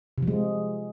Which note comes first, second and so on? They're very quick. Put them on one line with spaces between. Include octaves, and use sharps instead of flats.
C3 F3 G#3